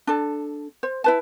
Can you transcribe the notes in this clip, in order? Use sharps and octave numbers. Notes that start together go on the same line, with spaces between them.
D4 A4
C5
E4 B4 A5